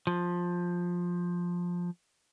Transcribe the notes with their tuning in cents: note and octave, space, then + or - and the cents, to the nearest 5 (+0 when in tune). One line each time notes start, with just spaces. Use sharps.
F3 +10